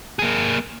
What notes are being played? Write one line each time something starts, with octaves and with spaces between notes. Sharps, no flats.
A#3 G#4